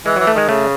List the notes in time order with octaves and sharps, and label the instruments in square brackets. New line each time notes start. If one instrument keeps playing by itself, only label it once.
[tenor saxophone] E3 [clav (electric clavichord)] G#3
[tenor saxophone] E3 [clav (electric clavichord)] F#3
[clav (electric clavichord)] A3
[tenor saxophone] D#3 [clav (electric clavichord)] G#3
[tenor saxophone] C#3 [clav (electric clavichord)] A3